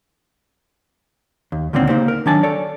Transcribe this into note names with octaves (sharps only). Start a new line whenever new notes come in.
D#2
C#2 A#2 D3 D#3 C4
C#3 A#3 D#4 G4 C5
A#4
D#3 F#3 D4 G#5 A5
A4 C#5 D5